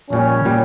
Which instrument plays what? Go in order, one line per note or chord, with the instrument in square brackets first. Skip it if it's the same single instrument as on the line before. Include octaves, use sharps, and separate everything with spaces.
[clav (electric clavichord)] A#1 A#2 G3 [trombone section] C#4
[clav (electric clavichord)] A#2 G3